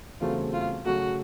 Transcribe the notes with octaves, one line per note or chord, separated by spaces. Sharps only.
E2 C#3 F#3 A3 C4 F4
F4
C#3 F#3 A3 F#4